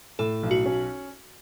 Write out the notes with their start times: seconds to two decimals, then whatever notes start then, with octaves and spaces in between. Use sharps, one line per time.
0.19 A2 A4
0.43 B1
0.51 F#4
0.66 C#4